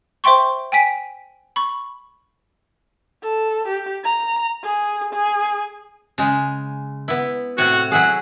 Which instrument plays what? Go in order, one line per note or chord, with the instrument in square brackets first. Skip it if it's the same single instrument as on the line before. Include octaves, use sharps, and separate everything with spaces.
[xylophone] C5 E5 G5 C6 C#6
G5 G#5 B6 D7
B5 C#6
[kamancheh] A4
G4
A#5
G#4
G#4
[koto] C#3 G#3
B3 E4
[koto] A2 C3 C#5 [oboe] F#4
[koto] F#3 E4 G#4 [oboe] F#5